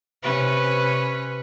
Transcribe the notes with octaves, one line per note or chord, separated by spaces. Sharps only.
C3 C#4 B4